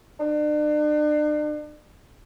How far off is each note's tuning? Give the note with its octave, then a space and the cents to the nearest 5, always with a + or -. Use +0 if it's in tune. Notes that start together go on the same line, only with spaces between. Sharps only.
D4 +40